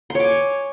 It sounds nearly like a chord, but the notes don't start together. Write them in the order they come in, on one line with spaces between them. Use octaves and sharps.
C6 C#5 D6 G#5